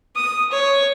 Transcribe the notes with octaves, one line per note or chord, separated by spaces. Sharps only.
D#6
C#5